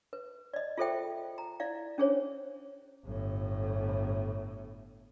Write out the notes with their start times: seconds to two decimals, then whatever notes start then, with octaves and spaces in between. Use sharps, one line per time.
0.13 B4
0.54 D5 D#5
0.78 F4 G#4 A4 C5 E5 G5
1.38 A#5
1.60 E4 D5 F5
1.98 C#4 D4 G#4 C5 C#5
3.05 G1 A2